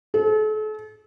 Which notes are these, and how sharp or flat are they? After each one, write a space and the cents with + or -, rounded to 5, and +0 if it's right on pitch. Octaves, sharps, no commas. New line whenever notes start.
A4 -40